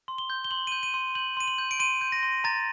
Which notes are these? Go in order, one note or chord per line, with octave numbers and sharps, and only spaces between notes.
C6
G7
G6
G7
C6 F#7
D#7
G6
D#7
C6
G6 F#7
C6 D#7
F#7
G6
D7
C6 D#7
G6
A#6
C6
A#5 A6